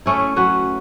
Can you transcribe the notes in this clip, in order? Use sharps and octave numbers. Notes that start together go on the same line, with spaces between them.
A3 C#4 E4
F#3 C#4 F#4 B4